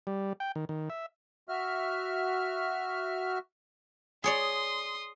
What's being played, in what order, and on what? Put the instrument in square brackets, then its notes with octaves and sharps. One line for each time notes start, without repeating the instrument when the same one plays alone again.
[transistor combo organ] G3
G5
D#3
D#3
E5
[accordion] F#4 E5 F6
[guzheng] G#4 C#5 D5 [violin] C6 D#6